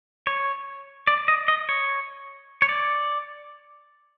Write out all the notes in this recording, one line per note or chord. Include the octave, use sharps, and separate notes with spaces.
C#5
D5
D#5
D#5
C#5
C#5
D5